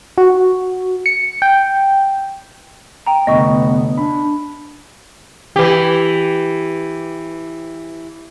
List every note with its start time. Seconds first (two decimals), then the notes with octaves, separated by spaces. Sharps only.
0.18 F#4
1.06 C#7
1.42 G5
3.06 G5 A#5
3.27 F1 D3 A3 B3 D#5 C#6
3.97 D4 B5
5.56 E3 G4